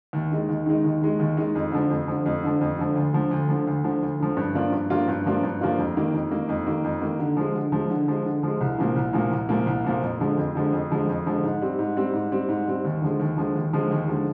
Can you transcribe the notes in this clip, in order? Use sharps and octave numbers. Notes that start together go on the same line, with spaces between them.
D#2
D#3 G#3 D#4
D#2
D#3 G#3 D#4
D#2
D#3 G#3 D#4
D#2
D#3 G#3 D#4
F2
D3 F3
F2
D3 F3
F2
D3 F3
F2
D3 F3
D2
D3 F3
D2
D3 F3
D2
D3 F3
D2
D3 F3
G2
F3 A#3 D4 F4
G2
F3 A#3 D4 F4
G2
F3 A#3 D4 F4
G2
F3 A#3 D4 F4
F2
D#3 A#3
F2
D#3 A#3
F2
D#3 A#3
F2
D#3 A#3
D3
F3 G#3
D3
F3 G#3
D3
F3 G#3
D3
F3 G#3
C2
A#2 F3 A#3
C2
A#2 F3 A#3
C2
A#2 F3 A#3
C2
A#2 F3 A#3
F2
D3 F3 G#3
F2
D3 F3 G#3
F2
D3 F3 G#3
F2
D3 F3 G#3
G#2
G3 C4
G#2
G3 C4
G#2
G3 C4
G#2
G3 C4
D#2
D3 F3 G#3
D#2
D3 F3 G#3
D#2
D3 F3 G#3
D#2
D3 F3 G#3